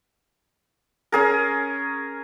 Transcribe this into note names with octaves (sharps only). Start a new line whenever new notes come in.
C#4 G#4 A#4